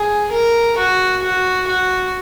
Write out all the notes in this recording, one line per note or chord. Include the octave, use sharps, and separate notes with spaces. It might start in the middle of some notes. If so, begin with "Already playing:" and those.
Already playing: G#4
A#4
F#4
F#4
F#4